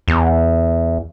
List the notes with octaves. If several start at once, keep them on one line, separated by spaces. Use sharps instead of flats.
E2